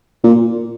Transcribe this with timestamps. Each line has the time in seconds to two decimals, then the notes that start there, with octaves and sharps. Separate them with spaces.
0.24 A#2